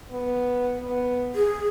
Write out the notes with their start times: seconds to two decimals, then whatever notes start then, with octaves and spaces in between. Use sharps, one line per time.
0.11 B3
0.80 B3
1.35 G#4